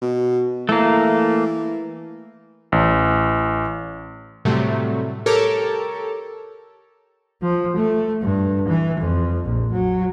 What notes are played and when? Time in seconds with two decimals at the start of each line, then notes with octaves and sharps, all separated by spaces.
0.02 B2
0.69 E3 A3 A#3
2.72 A1
4.45 A2 C3 F#3 G3 A3
5.26 G4 A4 A#4 C#5 A5 D6
7.41 F3
7.76 A3
8.21 G2
8.68 E3
9.00 F2
9.43 A#1
9.72 F#3